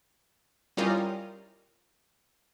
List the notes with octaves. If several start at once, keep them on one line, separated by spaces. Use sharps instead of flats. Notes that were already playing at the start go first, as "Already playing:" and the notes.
G3 C#4 E4 F4 A#4 D#5